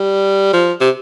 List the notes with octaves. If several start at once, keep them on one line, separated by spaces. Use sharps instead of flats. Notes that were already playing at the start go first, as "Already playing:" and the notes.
Already playing: G3
F3
C3